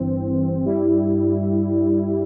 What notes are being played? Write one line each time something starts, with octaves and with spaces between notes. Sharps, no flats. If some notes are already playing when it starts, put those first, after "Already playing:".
Already playing: G1 G2 E3 C4
G2 G3 E4